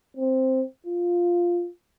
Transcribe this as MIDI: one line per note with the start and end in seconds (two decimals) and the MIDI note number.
0.17 0.62 60
0.86 1.67 65